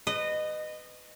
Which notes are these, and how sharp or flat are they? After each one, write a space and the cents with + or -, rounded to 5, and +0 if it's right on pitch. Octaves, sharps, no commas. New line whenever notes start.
B4 +20 D#5 -20